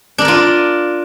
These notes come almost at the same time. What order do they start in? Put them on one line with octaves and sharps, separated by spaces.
D4 A#4 D5 F4